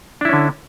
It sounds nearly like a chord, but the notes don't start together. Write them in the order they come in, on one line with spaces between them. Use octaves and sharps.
D4 E4 C#4 D3